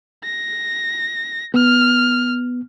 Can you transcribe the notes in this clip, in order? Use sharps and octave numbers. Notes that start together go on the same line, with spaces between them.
A#6
B3 F6